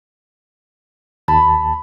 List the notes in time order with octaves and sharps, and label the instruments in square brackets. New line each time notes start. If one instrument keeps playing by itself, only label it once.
[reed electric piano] D#2 A5 [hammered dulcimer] B5